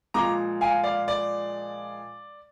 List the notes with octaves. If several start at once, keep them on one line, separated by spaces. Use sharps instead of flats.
A#2 F3 G#3 A#5 D6
F5 G#5
D5 F5
D5